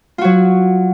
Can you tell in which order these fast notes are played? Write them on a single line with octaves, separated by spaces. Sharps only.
F4 F#4 F#3